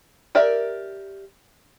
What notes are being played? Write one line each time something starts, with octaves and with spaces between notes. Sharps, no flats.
G4 A#4 D5 E5